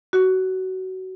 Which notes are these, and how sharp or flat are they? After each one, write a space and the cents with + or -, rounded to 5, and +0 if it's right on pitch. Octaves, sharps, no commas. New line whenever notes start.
F#4 +20